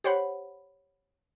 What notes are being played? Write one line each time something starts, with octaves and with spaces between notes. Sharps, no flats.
G4 C5 C#5 F#5 B5